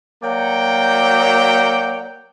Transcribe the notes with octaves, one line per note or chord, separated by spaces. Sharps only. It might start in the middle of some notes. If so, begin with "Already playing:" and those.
F#3 A#3 D5 F#5 G5